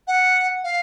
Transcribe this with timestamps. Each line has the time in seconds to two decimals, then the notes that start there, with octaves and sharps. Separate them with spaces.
0.07 F#5
0.64 F5